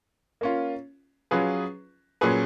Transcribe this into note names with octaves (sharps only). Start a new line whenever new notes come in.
A#3 C#4 F4
F#3 C#4 F4 G#4 B4
A#2 F#3 C#4 G#4 B4